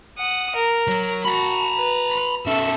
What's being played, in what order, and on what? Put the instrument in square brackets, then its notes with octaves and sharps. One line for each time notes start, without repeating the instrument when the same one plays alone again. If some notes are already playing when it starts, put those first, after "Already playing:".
[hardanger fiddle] F#5 D#6
A#4
[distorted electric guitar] F#3
[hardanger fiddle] F#4 [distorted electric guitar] A#5 B5
[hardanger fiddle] B4
[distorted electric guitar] B2 C#4 [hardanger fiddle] A4 E5